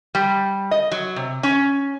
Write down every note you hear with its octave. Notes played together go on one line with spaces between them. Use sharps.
G3
D#5
F#3
C3
C#4